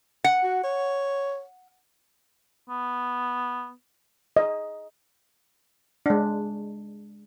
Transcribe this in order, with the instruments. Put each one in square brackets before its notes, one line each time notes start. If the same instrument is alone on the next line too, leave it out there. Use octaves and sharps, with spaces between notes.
[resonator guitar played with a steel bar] F#5
[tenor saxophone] F#4
C#5
[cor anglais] B3
[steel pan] D#5
G#3 D4